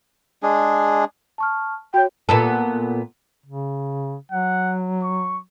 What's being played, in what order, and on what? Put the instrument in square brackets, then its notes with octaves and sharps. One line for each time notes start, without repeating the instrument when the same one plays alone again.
[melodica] G#3 D4 G#4
[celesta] A5 C#6 F6
[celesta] F#4 C#5 [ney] G5
[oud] A#2 B3 A4
[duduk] C#3
[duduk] F#3 [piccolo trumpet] F#5
[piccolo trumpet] C#6